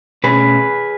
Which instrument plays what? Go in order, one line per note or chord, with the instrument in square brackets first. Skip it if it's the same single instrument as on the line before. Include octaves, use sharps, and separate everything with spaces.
[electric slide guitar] B2 A3 C#4 G#4 B4